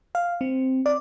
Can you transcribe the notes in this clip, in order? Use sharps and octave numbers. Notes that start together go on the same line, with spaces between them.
F5
C4
D5